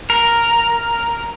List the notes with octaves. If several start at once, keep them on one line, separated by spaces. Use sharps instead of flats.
A#4